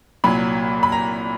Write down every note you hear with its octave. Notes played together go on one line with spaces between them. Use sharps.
C2 A#2 F#3 B5
B5
A#5